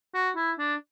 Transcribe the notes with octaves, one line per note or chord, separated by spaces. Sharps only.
F#4
E4
D4